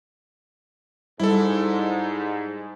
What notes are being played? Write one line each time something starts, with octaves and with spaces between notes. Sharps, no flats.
G#2 G3 E4 A4